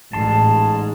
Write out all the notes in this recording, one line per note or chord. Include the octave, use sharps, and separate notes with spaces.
A1 G#2 A5 C6